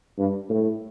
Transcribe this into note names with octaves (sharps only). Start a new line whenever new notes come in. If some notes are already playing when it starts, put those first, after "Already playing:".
G2
A2